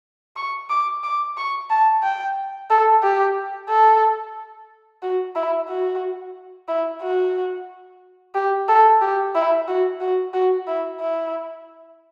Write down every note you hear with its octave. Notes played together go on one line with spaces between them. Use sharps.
C#6
D6
D6
C#6
A5
G5
A4
G4
A4
F#4
E4
F#4
E4
F#4
G4
A4
G4
E4
F#4
F#4
F#4
E4
E4